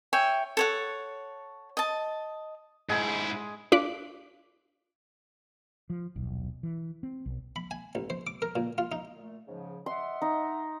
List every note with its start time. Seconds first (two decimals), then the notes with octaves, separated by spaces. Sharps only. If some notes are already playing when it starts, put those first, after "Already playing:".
0.13 C#5 E5 G5 G#5
0.57 A4 C#5 F#5
1.77 D#5 A5
2.89 G#2 G#3 E4 G#4 G#5
3.72 D4 F4 D6 F#6 B6
5.90 F3
6.15 D#1 B1
6.63 E3
7.03 C4
7.26 B1
7.56 B5
7.71 G#5
7.95 A1
8.10 C5
8.27 D6
8.42 A#4
8.56 A#2
8.78 F4
8.92 D#4
9.16 A#2 A3
9.48 G#2 C#3 F3
9.86 D#5 E5 F#5 C6
10.22 D#4